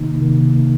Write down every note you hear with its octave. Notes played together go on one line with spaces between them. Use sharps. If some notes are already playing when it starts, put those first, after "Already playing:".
Already playing: C3 D#3 A#3 D#4
C3 D#3 A#3